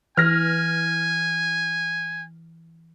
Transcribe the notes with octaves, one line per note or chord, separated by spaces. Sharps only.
E3 G#5 F6 A#6